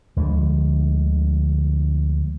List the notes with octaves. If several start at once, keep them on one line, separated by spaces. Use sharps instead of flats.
D2 D3 F3 G#3